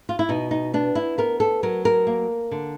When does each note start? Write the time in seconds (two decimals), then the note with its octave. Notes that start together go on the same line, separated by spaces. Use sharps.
0.09 F4
0.19 E4
0.29 B2 D#4
0.51 D#4
0.74 B3 D4
0.95 E4
1.18 B3 A#4
1.40 A4
1.63 F#3 A#4
1.85 A#4
2.07 A#3
2.51 D3